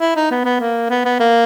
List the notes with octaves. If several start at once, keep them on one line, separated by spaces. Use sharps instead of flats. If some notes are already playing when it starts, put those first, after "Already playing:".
E4
D#4
B3
B3
A#3
B3
B3
A#3